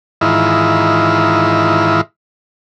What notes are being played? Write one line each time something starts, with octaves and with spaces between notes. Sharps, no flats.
G#2 D#3 E3 E4 F4